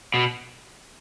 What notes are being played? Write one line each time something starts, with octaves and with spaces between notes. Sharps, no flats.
B2